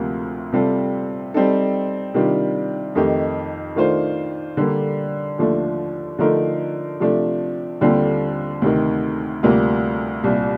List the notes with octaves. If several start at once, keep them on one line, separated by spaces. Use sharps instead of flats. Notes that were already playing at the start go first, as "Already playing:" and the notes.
Already playing: D2 C3 F3 A#3 F4
C3 G3 C4 F4 A4
G3 C4 D#4 A4
C3 D#3 G3 D4 F4
F2 D#3 A3 D#4 G4
D#3 A3 D4 F4 C5
D3 G3 A#3
D#2 D3 F3 A3 D4
D3 F3 A3 D#4 A#4
C3 F3 A3 D4
D#2 D3 G3 C4 F4
D2 C3 D#3
D2 C3 G3 A#3 F4
C2 A#2 G3